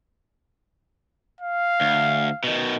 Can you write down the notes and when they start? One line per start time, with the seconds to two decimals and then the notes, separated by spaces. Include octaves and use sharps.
1.40 F5
1.81 D2
2.44 B2 D#3